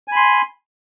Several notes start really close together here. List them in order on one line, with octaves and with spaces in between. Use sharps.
G#5 B5 C6